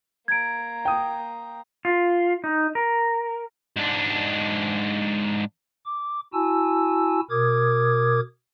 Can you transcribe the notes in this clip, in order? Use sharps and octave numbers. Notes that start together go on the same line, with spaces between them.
A#3 A#5 G#6 D7
G5 D#6
F4
D#4
A#4
G#2 D4
D6
E4 F#4 G#5 A5 E6
B2 A#4 D6 D#6 G#6